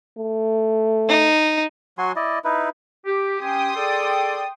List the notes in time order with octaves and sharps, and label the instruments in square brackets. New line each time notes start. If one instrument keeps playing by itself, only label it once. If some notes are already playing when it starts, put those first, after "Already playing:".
[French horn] A3
[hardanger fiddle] D#4
[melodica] F#3 F#4 G#5 C6
E4 D5 D#5
D#4 E4 B4
[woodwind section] G4
[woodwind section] C#4 G4 G#5 [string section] G5 C6 D#6
[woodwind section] G#4 A4 D5